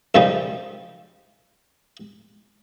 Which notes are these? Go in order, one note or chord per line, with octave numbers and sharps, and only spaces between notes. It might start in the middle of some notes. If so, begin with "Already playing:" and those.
F#2 C#3 F3 G3 D#4